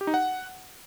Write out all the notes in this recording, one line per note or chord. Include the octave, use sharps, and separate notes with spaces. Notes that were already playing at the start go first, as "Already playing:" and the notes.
G4
D#4
F#5